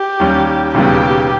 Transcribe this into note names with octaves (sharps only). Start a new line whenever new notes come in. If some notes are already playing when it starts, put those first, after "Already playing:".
Already playing: G4
D#2 D#3 G3 C#4
E1 D#2 C#3 G3 B3 G4